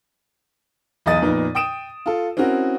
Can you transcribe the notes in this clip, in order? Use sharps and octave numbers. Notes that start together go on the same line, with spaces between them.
B1 E2 D#5 D#6 A6 D#7
F2 A#2 B3 D#4
G5 D#6 D7 E7
F4 A4
C4 C#4 E4 F#4 A#4